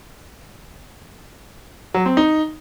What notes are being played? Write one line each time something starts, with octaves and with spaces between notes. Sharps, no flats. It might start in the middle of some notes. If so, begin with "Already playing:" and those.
F#3
C4
D#4